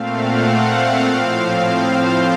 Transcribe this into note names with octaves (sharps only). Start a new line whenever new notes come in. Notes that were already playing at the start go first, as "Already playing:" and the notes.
Already playing: A#2 A3 C4 F5
F#5
F5
A2 F3 C4
C5